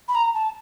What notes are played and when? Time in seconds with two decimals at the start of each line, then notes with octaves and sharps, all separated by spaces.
0.08 B5
0.15 A#5
0.34 A5